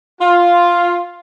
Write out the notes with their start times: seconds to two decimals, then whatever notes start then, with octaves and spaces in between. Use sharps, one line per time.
0.20 F4